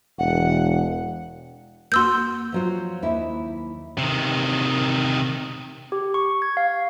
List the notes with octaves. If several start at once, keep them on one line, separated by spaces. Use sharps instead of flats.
E1 F#5
A#3 F#4 C6 E6 G6
F3 F#3 F4
D#2 E4
C3 D#3
G4
C#6
G#6
F5